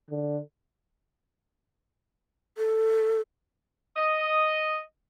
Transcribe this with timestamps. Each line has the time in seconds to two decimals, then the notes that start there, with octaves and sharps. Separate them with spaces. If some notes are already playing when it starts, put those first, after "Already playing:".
0.11 D3
2.58 A4
3.96 D#5